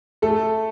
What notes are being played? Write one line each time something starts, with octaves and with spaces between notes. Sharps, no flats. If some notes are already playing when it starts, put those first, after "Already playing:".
A3 A4